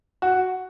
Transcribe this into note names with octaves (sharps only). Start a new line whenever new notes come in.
F#4